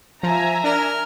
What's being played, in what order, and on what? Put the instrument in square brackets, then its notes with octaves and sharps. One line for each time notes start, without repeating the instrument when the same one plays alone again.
[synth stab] F3 [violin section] E5 G#5 A#5
[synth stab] D4 [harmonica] A#4